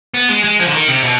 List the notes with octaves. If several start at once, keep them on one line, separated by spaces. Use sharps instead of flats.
B3
G#3
G#3
F3
D3
D#3
C3
B2